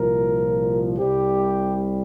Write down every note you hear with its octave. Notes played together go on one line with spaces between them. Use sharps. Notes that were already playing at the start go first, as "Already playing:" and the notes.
Already playing: C2 A#2 F3 A#4
C2 C3 G3 G4